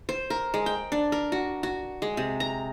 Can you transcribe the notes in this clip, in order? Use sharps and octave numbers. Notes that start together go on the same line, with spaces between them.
C5
A#4
G#3
G5
D4
A#4
F#4
F#4
G#3
C3
A#5